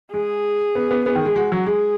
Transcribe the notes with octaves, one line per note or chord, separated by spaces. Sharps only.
G#3 G#4
B3
B3
B3 G#4
D#3
G#3
G#3 F#4
F#3
G#3 G#4